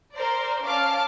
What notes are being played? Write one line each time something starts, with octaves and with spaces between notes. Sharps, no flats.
A#4 C5 D5
C#4 F5 A5 D6 F6